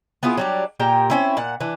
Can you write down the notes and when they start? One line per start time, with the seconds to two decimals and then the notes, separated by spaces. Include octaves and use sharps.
0.23 B3 E4 F4 G#4
0.37 F#3 G3 D4
0.80 A#2 G4 A#4 G5
1.10 C4 C#4 E4
1.37 A#2 F#5
1.60 E3 D4